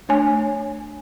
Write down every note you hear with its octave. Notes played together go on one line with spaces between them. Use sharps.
A3 D4 C#5 G#5